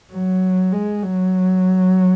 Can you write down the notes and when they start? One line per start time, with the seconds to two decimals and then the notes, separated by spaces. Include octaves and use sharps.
0.13 F#3
0.72 G#3
1.03 F#3